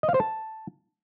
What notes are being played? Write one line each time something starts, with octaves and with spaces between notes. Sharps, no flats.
D#5
F5
C5
A5